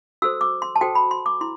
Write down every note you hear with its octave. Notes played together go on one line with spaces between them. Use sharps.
F#4 A4 C5 E6
D6
C6
A5
F#4 A4 C5 G5
B5
C6
D6
E4 C6